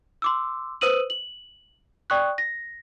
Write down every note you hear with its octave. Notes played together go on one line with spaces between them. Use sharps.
C6 D6 E6
B4 C5 D#6 E6 D#7 F#7
F#7
D5 G5 C#6 D#6 F#6
A#6